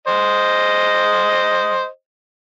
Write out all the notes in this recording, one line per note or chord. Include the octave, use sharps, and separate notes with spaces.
C5 D#5